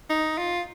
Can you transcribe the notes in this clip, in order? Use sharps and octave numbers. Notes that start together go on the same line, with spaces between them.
D#4
F4